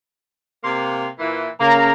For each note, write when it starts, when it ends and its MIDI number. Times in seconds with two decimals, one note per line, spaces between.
0.63 1.06 48
0.63 1.06 58
0.63 1.06 84
1.18 1.48 46
1.18 1.48 52
1.60 1.92 49
1.60 1.93 58
1.60 1.92 82